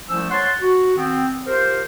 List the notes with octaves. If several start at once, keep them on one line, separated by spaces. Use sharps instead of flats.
C2 F3 A3 C#4 E6
C#5 F#5 A5 C6
F#4
D#3 B3 C4
F4 G4 A#4 C5